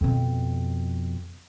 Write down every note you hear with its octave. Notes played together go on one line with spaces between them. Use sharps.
F2 B2